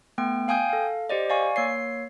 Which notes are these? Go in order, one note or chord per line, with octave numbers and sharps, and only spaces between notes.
A3 B3 G5
F5 G5 G#5 D#6 G6
A4 F5
G4 C5 D5 D#5
D5 F5 G#5 C#6
A#3 C#5 C7